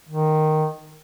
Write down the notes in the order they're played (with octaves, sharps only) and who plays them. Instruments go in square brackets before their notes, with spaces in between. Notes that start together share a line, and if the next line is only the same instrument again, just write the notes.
[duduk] D#3